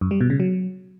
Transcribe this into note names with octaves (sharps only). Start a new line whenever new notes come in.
F#2
G3
B2
C#3
F#3